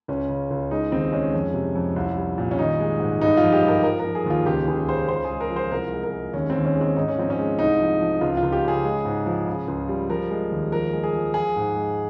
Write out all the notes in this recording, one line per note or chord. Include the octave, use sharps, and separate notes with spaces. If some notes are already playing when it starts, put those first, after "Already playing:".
C#2 C#4
C#3
C#2
G#3 D#4
D#2 C4
G#3 C#4
F2
C3
F2
C2
G3
A#2
C#4
D#3 D#4
G#3
G#2
G2 D#4
F4
F3
G4
G2
A#4
F3 A#4
A#4
F3
G#4
D#2 F4
C#2 G4
C#2 G#4
C#3 C5
C#2 C5
G#4
G#3
A#4
F3
C5
C2 A#4
G#3
A#4
G#3
D#2 C#4
C4
D#2
C#4
G#3
C4
G#2 D#4
C#4
F3 C4
C#4
G#3
C2 D#4
F3
F3
C#2 F4
F4
C#2
G4
C#3 G#4
G#3
G#2
F3
C#3
C#2
G3
F3 A#4
G#3
D#2
F3 A#4
G#3
G#4
F3
F3 G#4
G#2
G#3